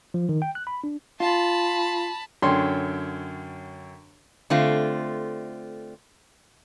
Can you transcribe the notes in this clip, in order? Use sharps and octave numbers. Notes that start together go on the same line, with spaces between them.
F3
D#3
G5
F#6
B5
D4
F4 A5 B5
F#2 D3 C#5 G5 C6
D3 A3 C4 F4